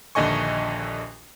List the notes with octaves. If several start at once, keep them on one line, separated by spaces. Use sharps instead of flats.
A#1 D#2 D3 D#5 G#5 C#6